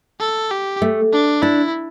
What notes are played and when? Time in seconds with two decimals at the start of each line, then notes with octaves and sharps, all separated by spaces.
0.20 A4
0.51 G4
0.82 A3
1.13 D4
1.42 D4 E4